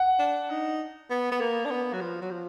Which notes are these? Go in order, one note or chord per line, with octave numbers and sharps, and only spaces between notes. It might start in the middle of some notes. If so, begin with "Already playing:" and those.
Already playing: F#5
D4
D#4
B3
B3
A#3
D4
B3
F#3
F3
F#3
F3